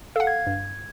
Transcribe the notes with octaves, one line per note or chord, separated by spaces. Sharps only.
A4 F5 F#5
G#6
G2